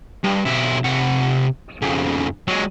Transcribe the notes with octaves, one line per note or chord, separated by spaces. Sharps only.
G2
B1 E4
C3 F#5
F2 C#3
F#3 G#3